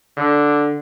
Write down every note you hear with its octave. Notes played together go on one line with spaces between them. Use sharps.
D3